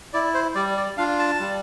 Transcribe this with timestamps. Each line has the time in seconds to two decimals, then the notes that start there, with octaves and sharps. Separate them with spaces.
0.13 E4 D5
0.34 C5
0.55 G3 D5
0.77 D5
0.97 D4 F4 F5
1.19 A5
1.40 G3